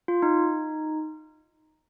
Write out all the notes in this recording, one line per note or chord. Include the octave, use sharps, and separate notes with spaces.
F4
D#4